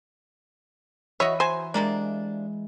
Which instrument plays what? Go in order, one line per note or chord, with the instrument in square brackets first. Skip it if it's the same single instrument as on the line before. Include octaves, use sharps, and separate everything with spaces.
[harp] E3 [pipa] F#4 D#5 E5 [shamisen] C#5
[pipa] F#3 G#5 [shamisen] C5
[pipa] C3 A#3 D4 [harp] G#3